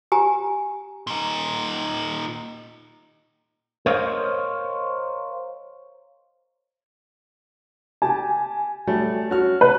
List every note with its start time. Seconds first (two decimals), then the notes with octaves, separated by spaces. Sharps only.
0.12 G4 G#5 A#5
1.07 A#2 D#4
3.86 A#4 C5 C#5 D#5 F5
8.02 G4 G#5 A5
8.87 F#3 G3 A3
9.30 C#4 F#4 F6
9.61 B4 C#5